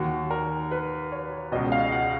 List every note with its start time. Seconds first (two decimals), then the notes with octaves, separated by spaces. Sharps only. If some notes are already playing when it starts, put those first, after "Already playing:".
Already playing: D#2 D#3 F#4
0.31 A#4
0.71 B4
1.12 C#5
1.52 C#2 B2 D#5
1.72 F5
1.92 F#5